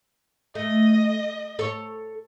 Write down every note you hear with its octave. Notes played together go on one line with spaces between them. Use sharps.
A3 D#5
A4 C#5